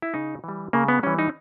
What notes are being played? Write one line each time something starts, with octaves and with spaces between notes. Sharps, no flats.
E4
C#3 D#4
E3 G3
C#3 A#3
B3
E3 G3 C#4
D#4